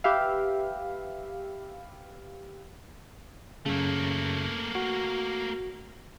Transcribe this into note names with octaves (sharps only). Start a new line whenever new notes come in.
G4 B4 E5 F5
F#2 C#3 A3 A#3
F#4